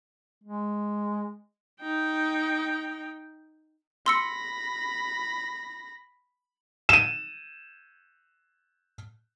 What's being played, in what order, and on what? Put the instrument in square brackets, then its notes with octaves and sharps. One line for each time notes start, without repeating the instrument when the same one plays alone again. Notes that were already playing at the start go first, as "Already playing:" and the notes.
[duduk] G#3
[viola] D#4 G5
[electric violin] B5 A#6 [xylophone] C6 E6 C#7
[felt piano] D#7 E7